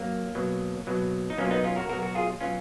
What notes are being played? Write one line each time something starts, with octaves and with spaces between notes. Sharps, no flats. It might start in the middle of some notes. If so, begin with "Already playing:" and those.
Already playing: F#3 A#3
B2 F#3
B2 F#3
D#4
B2 F#3 A#3 C#4
F4
B3 D#4
C#4 F4
F#4 A#4
B2 F#3 F#4 A#4
F#4 A#4
F4 G#4
B2 F#3 C#4 F4